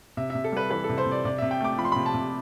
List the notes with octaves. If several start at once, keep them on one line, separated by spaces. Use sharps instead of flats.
C3 E5
C3 E5
A4
G3 B4
E3 B4
A4
C3
C5
C3
D5
C3 D5
C3 E5
G5
A3 D6
F3 B5
C6
C3 B5
A5
C3